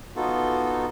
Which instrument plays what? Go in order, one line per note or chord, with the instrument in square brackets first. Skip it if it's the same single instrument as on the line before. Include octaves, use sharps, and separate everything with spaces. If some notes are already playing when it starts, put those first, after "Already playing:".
[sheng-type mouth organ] B3 D#4 F4 F#4 A4